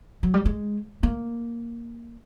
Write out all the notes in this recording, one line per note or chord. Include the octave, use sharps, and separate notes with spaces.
F#3
G3
G#3
A#3